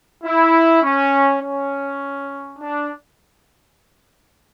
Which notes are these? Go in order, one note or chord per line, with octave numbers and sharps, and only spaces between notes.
E4
C#4
C#4
D4